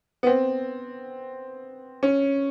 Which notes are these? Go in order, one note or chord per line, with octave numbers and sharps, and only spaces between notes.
B3
C4
C#4